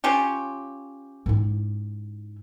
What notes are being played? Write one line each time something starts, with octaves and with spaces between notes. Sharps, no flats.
C#4 F4 G4
G#2 E4